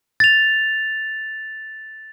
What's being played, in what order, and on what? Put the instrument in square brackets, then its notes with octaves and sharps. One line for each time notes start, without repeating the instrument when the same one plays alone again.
[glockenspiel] A6 F7